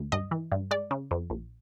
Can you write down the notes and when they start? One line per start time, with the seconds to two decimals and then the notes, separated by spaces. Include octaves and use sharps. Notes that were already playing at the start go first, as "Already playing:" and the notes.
Already playing: D2
0.12 G2 D#5
0.31 E3
0.52 G2
0.71 G#3 D5
0.91 C#3
1.11 F2
1.30 A#1